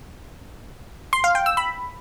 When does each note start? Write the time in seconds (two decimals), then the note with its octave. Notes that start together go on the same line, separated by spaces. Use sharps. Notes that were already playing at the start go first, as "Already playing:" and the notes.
1.13 C6
1.24 F5
1.35 G5
1.46 E6
1.57 B5